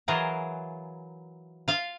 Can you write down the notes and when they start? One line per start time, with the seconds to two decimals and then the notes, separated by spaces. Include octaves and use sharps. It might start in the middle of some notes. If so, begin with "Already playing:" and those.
0.08 E3 F#3 F4 G#4 A#4
1.68 F4 F5